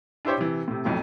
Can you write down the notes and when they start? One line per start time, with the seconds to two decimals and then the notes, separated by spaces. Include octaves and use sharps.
0.25 D4 E4 G4 C5 C#5
0.37 C3 E3
0.68 A2 C3
0.85 B1 F2 A2 F#3